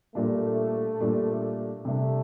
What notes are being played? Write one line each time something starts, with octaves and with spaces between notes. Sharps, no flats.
A#2 G3 A3 D4
A#2 G3 D4
C3 G3 A3 D4